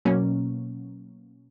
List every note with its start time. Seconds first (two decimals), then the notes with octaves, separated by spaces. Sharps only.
0.05 B2 F#3 A#3 C#4